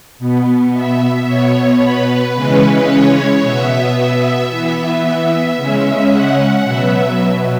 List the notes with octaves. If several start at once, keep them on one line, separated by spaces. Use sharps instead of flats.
B2 B3
E5
B2 B3 C#5
B4
C#3 E3 G#3 C#4 B4
C#5
B2 B3 E5
E5
E3 B3 E5
C#3 G#3 C#4
F#5
B2 F#3 B3 E5